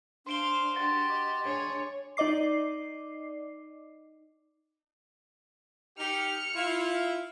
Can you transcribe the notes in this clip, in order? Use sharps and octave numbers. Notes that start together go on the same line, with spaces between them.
D4 C5 F5 C6 D7 G7
F#4 G4 C6 A6
D#5 D6
D4 G#4 C#5
D#4 D5 D#5 D6 C7
D#4 G4 F6 C#7
E4 F4